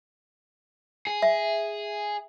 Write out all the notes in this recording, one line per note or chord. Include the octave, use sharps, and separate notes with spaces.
G#4
E5